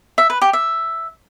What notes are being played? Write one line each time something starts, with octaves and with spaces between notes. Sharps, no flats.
E5
B4
G4
E5